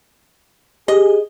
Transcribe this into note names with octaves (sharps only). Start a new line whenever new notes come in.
G4 G#4 D#5